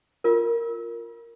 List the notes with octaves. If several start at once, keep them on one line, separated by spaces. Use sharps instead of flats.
F4 A#4